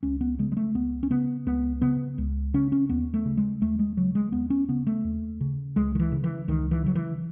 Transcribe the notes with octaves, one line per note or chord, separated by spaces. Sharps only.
C#2 C#4
B3
C#3 G#3
G#3
A3
C#2 B3
C#4
C#3 B3
C#2 B3
C#3 B3
C#2
C#3 C#4
C#4
D#2 B3
A3
C#3
G#3
D#2 A3
G#3
C#3 F#3
G#3
D#2 B3
C#4
C#3 B3
A3
D#2
C#3
C#2 G#3
D#3
E3
C#3
E3
C#2 D#3
E3
C#3 F#3
E3